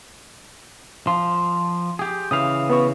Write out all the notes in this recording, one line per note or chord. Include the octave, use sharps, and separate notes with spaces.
F3 C6
G4 G#4
C#3 E3 F5 D#6
B3 B4 C#6